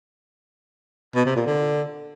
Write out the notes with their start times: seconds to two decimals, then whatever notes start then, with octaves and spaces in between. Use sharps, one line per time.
1.15 B2
1.26 C3
1.36 A#2
1.46 D3